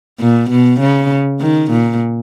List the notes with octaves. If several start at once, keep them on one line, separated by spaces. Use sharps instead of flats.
A#2
B2
C#3
D#3
A#2